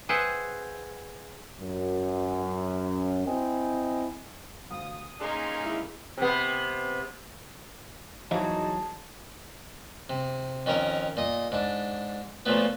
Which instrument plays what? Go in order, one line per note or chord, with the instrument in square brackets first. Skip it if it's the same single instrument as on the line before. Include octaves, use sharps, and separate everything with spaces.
[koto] G#4 B4 C5 E5 F#5 G5
[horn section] F#2
C4 E4 D#5 G5 G#5
[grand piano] D2 F5 [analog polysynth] D#6
[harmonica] A#3 C#4 D#4 [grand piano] G#4 [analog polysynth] G#5 A#5 C6
[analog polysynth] G#3 E4
[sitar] C3 B3
[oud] E2 F#3 [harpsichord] F3 E5 [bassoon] D#4 [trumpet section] G#4 A5
[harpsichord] C3
F2 D#3 C#4 A#4 A#5
A#2 D#5 D#6
G#2 D4
A#2 F3 F#3 A3 B3